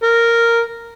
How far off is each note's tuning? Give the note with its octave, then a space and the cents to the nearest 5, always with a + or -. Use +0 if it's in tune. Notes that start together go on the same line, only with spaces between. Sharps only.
A#4 -5